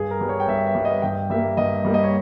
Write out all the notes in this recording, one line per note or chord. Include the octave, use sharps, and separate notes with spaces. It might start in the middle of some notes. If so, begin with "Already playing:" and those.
Already playing: G2 G#4
A#4
G3 B3
C#5
G5
G2 E5
E5
G3 B3
D#5
G2 G5
G3 A#3 E5
G2 D#5
G3 A#3
D#5
C#5